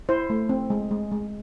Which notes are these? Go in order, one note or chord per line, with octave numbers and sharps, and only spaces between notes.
E4 C5
A3
C4
G#3
G#3
G#3